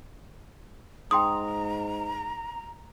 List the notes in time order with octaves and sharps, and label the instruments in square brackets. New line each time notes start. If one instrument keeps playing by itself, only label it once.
[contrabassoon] G#2 [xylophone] G5 C6 D#6 [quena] A#5